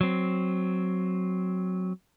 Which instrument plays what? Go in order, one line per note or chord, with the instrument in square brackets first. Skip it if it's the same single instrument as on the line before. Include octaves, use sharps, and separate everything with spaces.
[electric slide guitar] F#3 C4